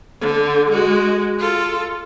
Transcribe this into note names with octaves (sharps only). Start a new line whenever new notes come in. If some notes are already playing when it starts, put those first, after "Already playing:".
D3
G#3 F#4
F4 A4